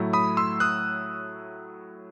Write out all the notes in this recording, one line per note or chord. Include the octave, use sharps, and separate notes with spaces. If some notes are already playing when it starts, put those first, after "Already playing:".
Already playing: A2 F#3 A3 E4
B5 D#6
C6 E6
D#6 F#6